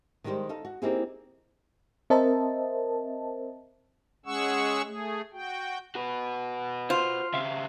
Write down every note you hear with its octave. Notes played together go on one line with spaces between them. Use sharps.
D#3 G3 G#3 G4 C5
D#4 A4 F5
F#4
A#3 C4 D#4 E4 G4 G#4
C4 A#4 C5 D#5 E5 A5
G#3 C#4 G#4 F#5 C#6 E6
A3 G#4
F#4 G5
F#4 B4
F4 C5
C#3 C4 E5 F5